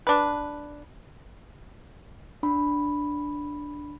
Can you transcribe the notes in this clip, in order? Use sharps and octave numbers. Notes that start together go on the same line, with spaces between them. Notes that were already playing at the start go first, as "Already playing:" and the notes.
D4 B4
D4 B5